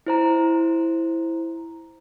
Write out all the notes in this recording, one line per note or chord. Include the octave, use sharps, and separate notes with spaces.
E4 C5 A#5